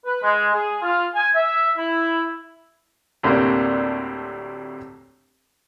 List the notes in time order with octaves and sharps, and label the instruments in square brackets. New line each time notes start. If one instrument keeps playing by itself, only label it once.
[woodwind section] B4
G#3
G#4
F4
G#5
E5
E4
[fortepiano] D2 A2 C3 A#3 C4 D4